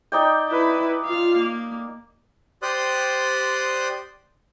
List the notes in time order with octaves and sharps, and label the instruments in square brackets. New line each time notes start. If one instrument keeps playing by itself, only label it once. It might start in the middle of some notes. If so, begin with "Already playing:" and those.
[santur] D#4 D5 G5
[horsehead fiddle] E4 B4
F4 F5
A#3
[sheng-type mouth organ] G4 C5 D5 C6 D#6 F#6